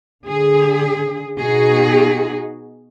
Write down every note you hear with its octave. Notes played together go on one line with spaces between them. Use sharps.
D3 G#4
B2 D#4 F#4 G#4